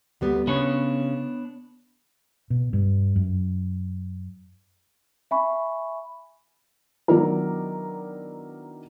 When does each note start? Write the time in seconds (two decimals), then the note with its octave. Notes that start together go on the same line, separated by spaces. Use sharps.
0.21 D2 G3 B3
0.47 C#3 B3 D4 C#5
2.50 B2
2.73 G2
3.16 F#2
5.31 E5 G#5 B5 C#6
7.08 D#3 F#3 B3 D4 E4 A#4